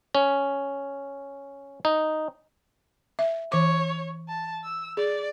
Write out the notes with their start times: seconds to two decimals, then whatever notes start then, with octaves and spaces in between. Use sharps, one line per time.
0.15 C#4
1.85 D#4
3.19 E5
3.52 E3 C#5 D6
4.29 A5
4.64 E6
4.97 G#4 D5